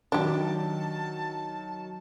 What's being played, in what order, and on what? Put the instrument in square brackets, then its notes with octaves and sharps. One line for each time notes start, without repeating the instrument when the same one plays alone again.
[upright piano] D#3 F#3 [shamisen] D4 G4 [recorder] A5